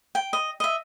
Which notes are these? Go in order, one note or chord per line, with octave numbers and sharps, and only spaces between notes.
G5
D#5
D#5 E5